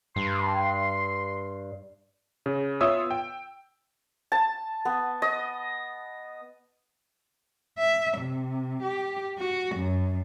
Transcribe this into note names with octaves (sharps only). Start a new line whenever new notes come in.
G2 C6
C#3
B3 F4 C#5 E5 D#6 E6
G5
A5
B3
D#5
E5
C3
G4
F#4
F#2